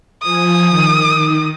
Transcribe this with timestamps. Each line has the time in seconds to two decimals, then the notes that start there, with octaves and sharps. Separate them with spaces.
0.23 F3 G#5 D#6
0.69 D#3